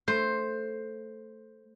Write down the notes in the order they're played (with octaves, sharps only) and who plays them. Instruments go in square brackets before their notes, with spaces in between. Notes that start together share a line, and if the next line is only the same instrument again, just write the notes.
[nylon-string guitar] A3 [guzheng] C5